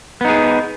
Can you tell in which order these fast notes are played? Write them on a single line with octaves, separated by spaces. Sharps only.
B3 D#4 G#4